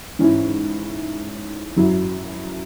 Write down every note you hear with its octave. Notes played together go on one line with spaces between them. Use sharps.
G#2 E3 C#4 E4
F#2 F#3 E4